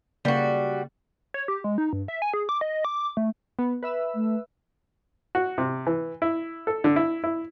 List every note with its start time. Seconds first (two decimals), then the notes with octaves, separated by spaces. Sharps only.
0.25 C#3 G3 A#3 F#4
1.34 C#5
1.48 G4
1.64 G#3
1.78 D#4
1.93 G2
2.08 E5
2.22 G#5
2.34 G#4
2.49 D6
2.61 D#5
2.85 D6
3.17 A3
3.59 B3
3.83 B4 E5 E6
4.14 A3
5.35 F#4
5.58 C3
5.87 E3
6.22 E4
6.67 A4
6.84 D3
6.96 E4
7.24 E4